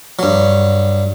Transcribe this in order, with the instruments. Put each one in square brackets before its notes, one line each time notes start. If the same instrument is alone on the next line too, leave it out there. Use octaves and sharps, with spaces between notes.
[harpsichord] G2 F#3